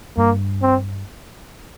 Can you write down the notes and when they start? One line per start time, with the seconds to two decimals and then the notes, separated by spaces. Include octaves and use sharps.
0.17 G2 A#3
0.62 C4